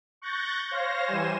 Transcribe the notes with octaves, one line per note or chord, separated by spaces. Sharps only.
C#6 F#6 G6 A6 A#6
C5 C#5 F5 A#6
E3 G3 C5 G#5 E7